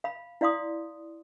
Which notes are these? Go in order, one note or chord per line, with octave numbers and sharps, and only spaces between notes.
F5 B5
E4 D5 F5 C6 D#6